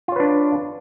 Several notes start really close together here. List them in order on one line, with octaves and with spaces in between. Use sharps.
F4 C#5 B4 D4